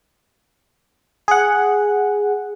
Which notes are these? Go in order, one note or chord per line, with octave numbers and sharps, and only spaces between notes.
G#4 F#5